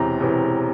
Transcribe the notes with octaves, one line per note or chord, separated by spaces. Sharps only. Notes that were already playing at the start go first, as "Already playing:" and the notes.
Already playing: E1 E2 C3 E3 A#5
E1 E2 C3 E3